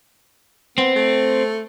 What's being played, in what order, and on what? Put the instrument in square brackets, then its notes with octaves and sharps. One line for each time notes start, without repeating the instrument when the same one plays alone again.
[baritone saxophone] B3 [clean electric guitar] C4
[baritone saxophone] A3